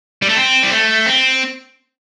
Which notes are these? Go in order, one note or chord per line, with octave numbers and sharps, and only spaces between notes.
G3
A3
C4
G3
A3
C4